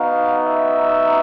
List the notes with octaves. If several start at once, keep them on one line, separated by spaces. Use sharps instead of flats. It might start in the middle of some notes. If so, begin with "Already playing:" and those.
Already playing: B3 D#4 F#4 F5
E5